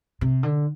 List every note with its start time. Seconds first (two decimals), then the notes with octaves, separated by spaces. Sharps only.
0.21 C3
0.43 D3